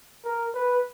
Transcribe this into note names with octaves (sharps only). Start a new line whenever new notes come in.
A#4
B4